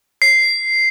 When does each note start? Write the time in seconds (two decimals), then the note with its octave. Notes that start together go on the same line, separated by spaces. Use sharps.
0.22 C7